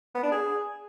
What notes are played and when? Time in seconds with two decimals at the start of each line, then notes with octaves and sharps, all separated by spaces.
0.15 B3
0.23 D4
0.31 G#4